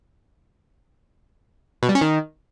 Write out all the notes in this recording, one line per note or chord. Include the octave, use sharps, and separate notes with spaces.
B2
G3
C#4
D#3